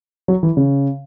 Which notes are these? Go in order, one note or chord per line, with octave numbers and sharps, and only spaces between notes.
F#3
E3
C#3